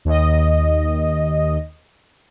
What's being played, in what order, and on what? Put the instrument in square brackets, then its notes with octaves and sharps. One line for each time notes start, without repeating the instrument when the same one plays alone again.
[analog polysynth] D#2 D#5